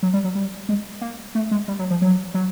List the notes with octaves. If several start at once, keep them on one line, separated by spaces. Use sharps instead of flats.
F#3
G3
F#3
G3
G#3
A#3
A3
G#3
G3
F#3
F3
F#3
F#3